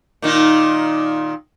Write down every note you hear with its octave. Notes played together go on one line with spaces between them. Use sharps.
A#2 D#3 D#4